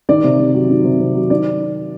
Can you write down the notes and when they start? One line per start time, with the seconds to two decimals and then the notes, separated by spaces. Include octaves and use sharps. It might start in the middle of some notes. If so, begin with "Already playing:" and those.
0.09 D#3 D5
0.24 C3
0.39 C3
0.55 F#3
0.70 D#3
0.85 C3
1.00 C3
1.15 F#3
1.30 D#3 D5